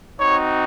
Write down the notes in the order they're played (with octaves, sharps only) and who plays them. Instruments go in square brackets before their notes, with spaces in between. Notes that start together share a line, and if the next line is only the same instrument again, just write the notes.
[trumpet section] C4 D#4 F#4 C#5